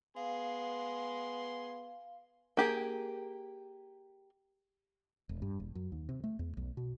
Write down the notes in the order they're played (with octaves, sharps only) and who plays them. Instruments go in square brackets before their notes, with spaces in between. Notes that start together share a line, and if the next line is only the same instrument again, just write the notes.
[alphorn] B3 [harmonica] G#4 C6 [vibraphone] F5
[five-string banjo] A#3 G4 G#4
[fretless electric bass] E1
G2
E1
F#2
D#2
C3
A3
E2
B1
B2